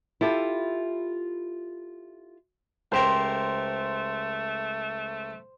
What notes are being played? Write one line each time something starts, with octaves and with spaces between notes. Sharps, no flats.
E4 F4 G4 A4
C#2 A3 G4 A#4 C5